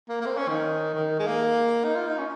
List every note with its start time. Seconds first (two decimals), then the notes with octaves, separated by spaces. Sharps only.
0.08 A#3
0.21 A#3
0.26 C4
0.37 C#4
0.49 D#3
0.94 D#3
1.19 G#3
1.27 A#3
1.84 D#4
1.95 F4
2.07 D#4
2.18 C#4